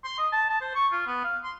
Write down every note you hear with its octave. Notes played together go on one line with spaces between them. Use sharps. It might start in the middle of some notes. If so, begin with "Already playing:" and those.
C6
D#5
A5
A5
C5
C#6
F4
B3
F5
C6